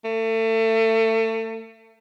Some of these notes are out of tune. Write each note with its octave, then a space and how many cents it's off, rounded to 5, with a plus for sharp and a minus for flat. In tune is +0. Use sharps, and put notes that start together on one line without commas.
A3 +30